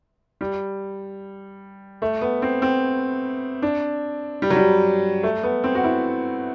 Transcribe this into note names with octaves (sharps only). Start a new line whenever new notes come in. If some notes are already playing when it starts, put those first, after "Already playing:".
G3
A3
B3
C4
C4
D4
G3
F#3
G3
A3
B3
C4
F#4
E4